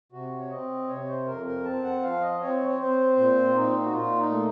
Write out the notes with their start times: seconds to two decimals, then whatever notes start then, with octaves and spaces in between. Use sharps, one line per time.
0.12 C3 F#4
0.39 C#5
0.50 C4 D#5
0.88 C3 C#5
1.07 C5
1.26 F2 A#4
1.46 A#4
1.65 C4 A5
1.84 F#5
2.02 F3 F5
2.21 D#5
2.40 C4 C#5
2.69 C#5
2.79 C4 C5
3.17 A#2 C5
3.48 F4
3.54 A#2 D#4
3.84 F#4
3.93 A#2 F4
4.18 D#4
4.30 A3